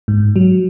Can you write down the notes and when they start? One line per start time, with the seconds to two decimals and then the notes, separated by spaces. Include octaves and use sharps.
0.08 G#2
0.36 F#3